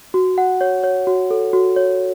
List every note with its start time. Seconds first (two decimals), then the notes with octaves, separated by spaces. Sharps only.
0.14 F#4
0.38 F#5
0.61 C#5
0.84 C#5
1.07 F#4
1.31 A4
1.53 F#4
1.76 C#5